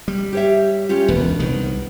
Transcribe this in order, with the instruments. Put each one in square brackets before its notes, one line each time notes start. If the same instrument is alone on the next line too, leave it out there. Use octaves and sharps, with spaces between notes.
[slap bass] G3
[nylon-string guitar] G4 C#5 E5
C#4 F4 G4
[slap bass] E1 D2 [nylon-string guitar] B3
[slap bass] C2 D#3